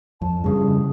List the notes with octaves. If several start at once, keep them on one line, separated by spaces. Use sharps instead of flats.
F2 A5
G2 C#3 G3 G#4